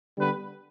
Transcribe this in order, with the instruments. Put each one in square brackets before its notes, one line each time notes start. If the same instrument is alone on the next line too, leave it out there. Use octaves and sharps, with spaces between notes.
[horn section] D3 G3 B3 B4